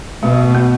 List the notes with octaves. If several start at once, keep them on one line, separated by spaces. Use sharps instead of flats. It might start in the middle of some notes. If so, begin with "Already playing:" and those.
B2 A3
B3